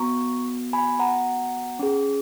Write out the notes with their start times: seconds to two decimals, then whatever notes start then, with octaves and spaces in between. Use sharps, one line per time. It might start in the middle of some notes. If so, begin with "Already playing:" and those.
Already playing: B3 F#4 A#5 C#6
0.73 G#5 B5
1.00 F#5 A#5
1.79 C#4 G#4